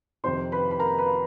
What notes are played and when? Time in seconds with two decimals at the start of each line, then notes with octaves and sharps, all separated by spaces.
0.24 F2 C3 D#3 C5 C6
0.52 B4 B5
0.71 B5
0.79 A#4 A#5
0.98 B4 B5